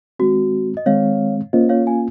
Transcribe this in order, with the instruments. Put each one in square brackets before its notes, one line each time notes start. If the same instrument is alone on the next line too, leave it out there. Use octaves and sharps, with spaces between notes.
[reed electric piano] D#3 G#3 C4 [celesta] F#4
[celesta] D#5
[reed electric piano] D#3 G#3 C4 [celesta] C#5 F5
[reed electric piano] A#3 C#4 F4 [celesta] C5 D#5
[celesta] C#5 F5
F5 G#5